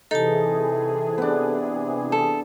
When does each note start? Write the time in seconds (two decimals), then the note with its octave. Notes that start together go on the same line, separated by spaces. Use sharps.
0.11 C3 E3 D#4 G#4 A4 A5
1.18 B3 D4
2.12 A4